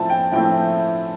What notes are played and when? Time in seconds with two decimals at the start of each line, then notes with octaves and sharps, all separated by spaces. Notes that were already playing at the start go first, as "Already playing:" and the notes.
Already playing: A2 F3 A3 C4 A5
0.10 G5
0.32 A2 F3 A3 C4 G5